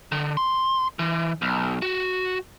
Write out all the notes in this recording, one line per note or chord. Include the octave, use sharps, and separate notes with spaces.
D3
C6
E3
B1
F#4